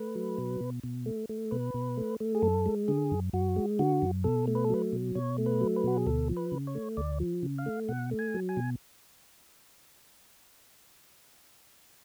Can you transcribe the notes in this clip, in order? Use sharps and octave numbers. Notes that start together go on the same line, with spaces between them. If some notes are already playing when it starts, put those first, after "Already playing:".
Already playing: A3 B4
F#3
B2
B2
B2
A3
A3
B2 B4
B2
A3
A3
G#4
F#2 A4
G#3
D3 G#4
F#2
F#2 F#4
G#3
D3 F#4
F#2
B2 A4
A3
B4
A4
F#3 B4
B2
B2 C#5
A3
B4
F#3
B4
B2 F#4
G#4
D2 A4
F3
B4
C#3
C#5
A3
D2 D5
F3
C#3
F5
A3
B2 F#5
A3
G#5
F#3
G#5
B2